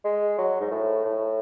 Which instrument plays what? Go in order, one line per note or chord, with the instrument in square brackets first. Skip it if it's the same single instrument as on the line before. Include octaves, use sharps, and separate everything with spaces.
[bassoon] G#3
F#3
G#2
A2
A2